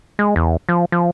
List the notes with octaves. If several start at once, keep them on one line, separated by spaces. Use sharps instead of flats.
G#3
E2
F3
F3